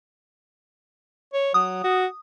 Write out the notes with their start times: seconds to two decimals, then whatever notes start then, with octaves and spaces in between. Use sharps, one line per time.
1.34 C#5
1.54 F#3 D#6
1.84 F#4